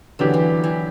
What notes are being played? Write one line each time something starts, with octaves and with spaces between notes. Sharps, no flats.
D3 E3 F#3 B3 D4 G4
E3
E3